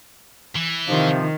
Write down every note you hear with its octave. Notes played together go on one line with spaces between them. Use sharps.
E3
C3 D#3 F3